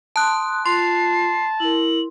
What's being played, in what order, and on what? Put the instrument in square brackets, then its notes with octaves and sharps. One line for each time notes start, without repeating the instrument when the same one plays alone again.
[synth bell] A5 F#6 [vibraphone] C6 D#6
[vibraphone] F4 [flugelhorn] A5 [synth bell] C6 [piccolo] C7
[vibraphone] E4 A#4 [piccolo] F#7